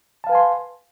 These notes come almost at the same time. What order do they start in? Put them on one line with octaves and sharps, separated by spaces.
A5 F5 B4 G#5 C6